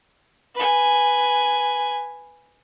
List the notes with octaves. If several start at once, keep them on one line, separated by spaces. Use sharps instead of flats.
B4 G#5